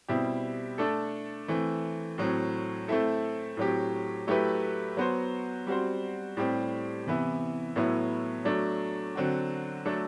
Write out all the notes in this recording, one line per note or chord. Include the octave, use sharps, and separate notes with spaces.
B2 G3 C4 E4 G4
A3 D4 A4
E3 A3 C4
A2 F#3 C4
A3 C4 E4 A4
A2 F#3 C4 G4
F#3 A3 E4 G4 B4
F#3 B3 F#4 C5
G3 C4 F#4 C5
A2 G3 C4 G4
C3 E3 B3 E4
A2 F#3 B3 E4
F#3 A3 D4
D3 F#3 C4 F#4
F#3 A3 D4 A4